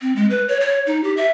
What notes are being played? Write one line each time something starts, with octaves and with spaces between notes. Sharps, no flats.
C4
G#3
B4
C#5
C#5
D#4
G4
E5